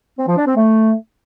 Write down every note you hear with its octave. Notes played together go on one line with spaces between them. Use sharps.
C4
F3
D4
C4
A3